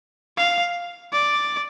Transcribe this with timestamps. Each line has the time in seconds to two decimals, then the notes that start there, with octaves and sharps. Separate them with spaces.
0.38 F5
1.13 D5